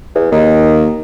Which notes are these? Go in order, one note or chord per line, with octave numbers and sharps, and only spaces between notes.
E2
D#2 D#3